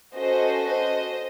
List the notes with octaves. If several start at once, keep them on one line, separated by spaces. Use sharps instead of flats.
C#4 F#4 A4 C5 D#5
C5 D#5